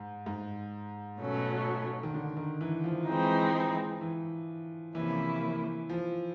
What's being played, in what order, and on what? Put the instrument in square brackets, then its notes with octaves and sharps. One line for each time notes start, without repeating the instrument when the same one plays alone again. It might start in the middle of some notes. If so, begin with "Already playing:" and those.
Already playing: [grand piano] G#2
G#2
[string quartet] B2 F#3 A3 C#4
[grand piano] D#3
D3
D#3
E3
F3
[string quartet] E3 G#3 C4 D#4
[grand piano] E3
[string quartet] C3 F3 A#3 C#4 E4 [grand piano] E3
[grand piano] F3